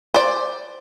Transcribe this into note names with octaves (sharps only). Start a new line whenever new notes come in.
C5 D5